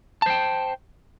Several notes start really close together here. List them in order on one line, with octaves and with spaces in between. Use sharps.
A5 C5 G5